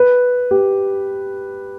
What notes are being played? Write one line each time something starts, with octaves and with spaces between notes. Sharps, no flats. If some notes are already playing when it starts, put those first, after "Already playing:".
Already playing: B4
G4